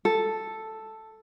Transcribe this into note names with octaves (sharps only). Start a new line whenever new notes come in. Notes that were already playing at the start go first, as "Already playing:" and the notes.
A4